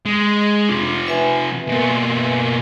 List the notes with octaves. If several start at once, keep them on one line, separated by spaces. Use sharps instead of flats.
G#3
C3 F3 D4
B4 E5 G#5
B2 A#3